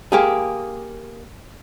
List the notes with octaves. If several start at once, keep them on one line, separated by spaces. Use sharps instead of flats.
A#3 G4 G#4